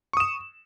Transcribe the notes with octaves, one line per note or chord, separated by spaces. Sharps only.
C#6 D#6 E7